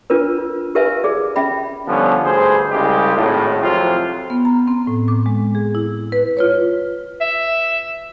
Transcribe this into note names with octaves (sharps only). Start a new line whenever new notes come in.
D4 F4 A#4 B4
F4
G4 A#4 B4 E5 F5 G#5
G#4 D5
C#4 E5 G5 B5
D3 F3 G3 B3 C#4
D2 G2 G#4 C5
C2 C#3 G3 G#3 G4
G#1 A2
F2 C3 F#3 C4 F4
B3
A#5
C4
A2
D6
G#3
G#4
E4
B4
F4 B4 C#5
E5